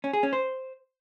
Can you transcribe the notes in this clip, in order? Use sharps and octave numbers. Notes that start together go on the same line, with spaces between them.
C#4
G#4
C#4
C5